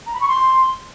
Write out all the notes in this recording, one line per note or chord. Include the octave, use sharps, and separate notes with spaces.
A#5
B5
C#6
C6